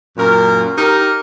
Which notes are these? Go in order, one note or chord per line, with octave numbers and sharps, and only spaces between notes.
F#2 A#2 A#4
D#4 G4 A#4